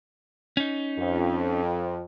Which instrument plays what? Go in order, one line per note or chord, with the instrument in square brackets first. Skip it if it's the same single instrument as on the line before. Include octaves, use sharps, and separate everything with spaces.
[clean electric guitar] C#4 D#4
[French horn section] F2